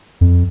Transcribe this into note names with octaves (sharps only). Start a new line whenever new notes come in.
F2